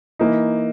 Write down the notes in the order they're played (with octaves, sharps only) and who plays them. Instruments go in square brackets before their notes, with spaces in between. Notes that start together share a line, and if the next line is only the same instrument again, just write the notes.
[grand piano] E3 A#3 D#4